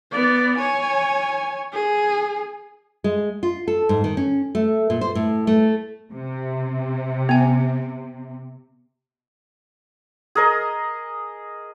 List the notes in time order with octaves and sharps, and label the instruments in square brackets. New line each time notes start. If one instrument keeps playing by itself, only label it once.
[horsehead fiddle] B3 D5
C#5 G#5
G#4
[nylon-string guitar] G#3
F4
A4
G#2
D#3
C#4
A3
A#2
C5
A2
A3
[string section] C3
[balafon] B3 G#5
[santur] G#4 A#4 D#5